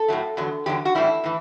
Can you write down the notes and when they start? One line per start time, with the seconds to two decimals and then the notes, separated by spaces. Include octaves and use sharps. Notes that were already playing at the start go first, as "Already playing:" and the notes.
Already playing: A4
0.08 A2 F#3 A3
0.37 E2 D3 F#3
0.66 E2 D3 F#3 G4
0.85 F#4
0.95 A2 E3 G3 E4
1.24 A2 E3